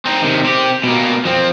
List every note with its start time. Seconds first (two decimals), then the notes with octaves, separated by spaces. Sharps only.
0.06 C4 D#4
0.22 C3 D#3
0.44 C4 G4
0.84 B2 A#3
1.25 F3 C4